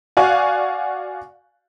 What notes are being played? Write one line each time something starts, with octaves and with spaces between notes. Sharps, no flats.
F#4 D5 F5 G#5 C#6 F#6